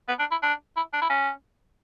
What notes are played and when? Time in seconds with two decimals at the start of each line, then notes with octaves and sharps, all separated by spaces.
0.08 B3
0.19 D4
0.31 E4
0.42 D4
0.76 E4
0.93 D4
1.01 E4
1.09 C#4